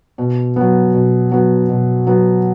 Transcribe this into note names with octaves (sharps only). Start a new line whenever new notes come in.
B2
F#3 B3
B2
F#3 B3
B2
F#3 B3